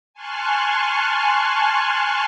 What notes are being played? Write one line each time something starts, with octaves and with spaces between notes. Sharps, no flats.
G#5 A5 C6 C#6 F6 F#6